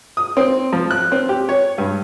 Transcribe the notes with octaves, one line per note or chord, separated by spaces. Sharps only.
D#6
C4
F3
F#6
C4
G4
C#5
G2